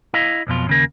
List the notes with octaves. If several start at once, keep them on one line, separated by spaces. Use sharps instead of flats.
E4 D#5 F5
B1 F2 B2 F4
D#2 C#3 A#3